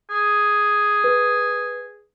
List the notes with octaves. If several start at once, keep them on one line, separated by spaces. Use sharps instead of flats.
G#4
B4